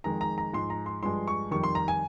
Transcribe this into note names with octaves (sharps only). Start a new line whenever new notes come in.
F2 D#3 G#3 A#5
A#5
A#5
G#2 F3 G#3 C6
A#5
C6
G2 F3 G#3 C6
C#6
F2 D#3 G3 C#6
C6
A#5
G#5